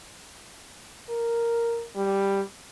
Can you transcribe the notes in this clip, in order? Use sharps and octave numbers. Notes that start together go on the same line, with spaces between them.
A#4
G3